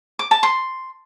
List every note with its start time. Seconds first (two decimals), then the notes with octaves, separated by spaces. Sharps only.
0.19 D6
0.31 A5
0.43 C6